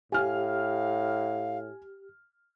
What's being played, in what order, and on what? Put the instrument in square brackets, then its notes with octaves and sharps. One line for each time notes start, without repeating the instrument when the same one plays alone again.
[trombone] A2 [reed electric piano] G4 [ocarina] F5 [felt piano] G#5 F6